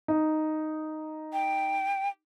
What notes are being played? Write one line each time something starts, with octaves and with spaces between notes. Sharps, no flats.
D#4
G5